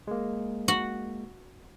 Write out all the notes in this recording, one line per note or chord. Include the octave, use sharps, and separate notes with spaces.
G#3 A#3
F#4 F#5